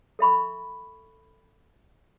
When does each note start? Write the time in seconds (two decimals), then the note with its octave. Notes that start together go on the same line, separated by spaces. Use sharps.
0.19 A4 E5 B5 C#6